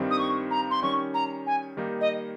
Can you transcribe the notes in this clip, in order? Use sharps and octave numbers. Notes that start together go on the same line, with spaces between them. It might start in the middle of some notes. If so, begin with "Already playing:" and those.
Already playing: G2 D#3 G3 C4 D#4
D#6
C#6
A#5
C6
D#3 G3 C#4 C#6
A#5
G#5
D#3 G3 A#3 D#4
D#5